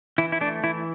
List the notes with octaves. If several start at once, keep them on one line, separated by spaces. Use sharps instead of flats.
E3 E4
E4
A3 D4
E3 E4